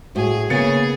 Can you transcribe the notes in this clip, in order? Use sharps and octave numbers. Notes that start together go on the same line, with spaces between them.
A2 F#4 G#4
C#3 A#3 B3 G#4 A6 C#7